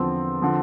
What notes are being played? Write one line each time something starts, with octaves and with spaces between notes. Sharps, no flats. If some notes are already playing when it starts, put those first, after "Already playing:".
Already playing: E2 D3 F3 C4
D3 F3